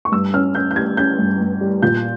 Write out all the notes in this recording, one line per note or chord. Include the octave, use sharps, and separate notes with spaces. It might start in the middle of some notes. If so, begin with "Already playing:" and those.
C#6
G2 E6
C#4 F6
C#4 G6
G6
G3 G#6
C#4 G6
G2
G2
G3
A#2 G6